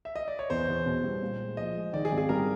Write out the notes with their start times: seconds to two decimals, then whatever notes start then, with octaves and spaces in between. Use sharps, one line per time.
0.05 E5
0.16 D#5
0.28 D5
0.39 C#5
0.50 E2 C5
0.67 E2
0.86 B2
1.03 G3
1.22 A#2
1.40 G#3
1.57 F3 D#5
1.75 G#3
1.93 D#3 D5
2.05 G#4
2.11 G#1
2.17 G#4
2.29 G3 A#4